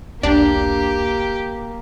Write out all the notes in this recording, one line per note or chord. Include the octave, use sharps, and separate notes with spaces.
E1 B1 A#3 D4 G4